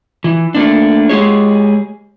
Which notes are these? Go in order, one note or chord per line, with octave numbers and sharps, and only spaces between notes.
E3
A3 A#3 D4
G#3 G4 G#4 C#5